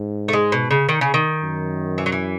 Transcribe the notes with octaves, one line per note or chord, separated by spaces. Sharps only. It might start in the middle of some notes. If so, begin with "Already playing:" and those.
Already playing: G#2
A3
G#3
B2
C#3
D#3
C#3
D#3
F#2
E3
F#3
E3